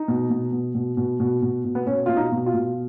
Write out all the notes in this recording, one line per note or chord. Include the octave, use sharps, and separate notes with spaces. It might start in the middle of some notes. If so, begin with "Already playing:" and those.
Already playing: D#4
B2
B2
B2
B2
B2
B2
B2
B2
B3
B2 C#4
B2 F4
D#4
B2
F4
B2